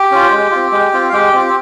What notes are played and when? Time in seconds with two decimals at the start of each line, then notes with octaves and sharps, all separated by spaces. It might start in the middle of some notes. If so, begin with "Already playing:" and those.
Already playing: G4 G5
0.12 C#4 F4
0.31 G#3
0.51 C4 F4
0.72 G#3
0.93 C4 F4
1.09 F5
1.13 G#3 G4 G5
1.33 C4 F4